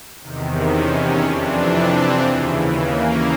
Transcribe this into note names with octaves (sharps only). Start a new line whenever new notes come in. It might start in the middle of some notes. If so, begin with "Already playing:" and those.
E2 C3 D#3
C#4
F2 C3 E3 D4
C4
D#2 C#3 E3
A#3